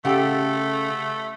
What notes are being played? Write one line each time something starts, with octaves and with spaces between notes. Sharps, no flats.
C#3 A3 G4 A4 F#5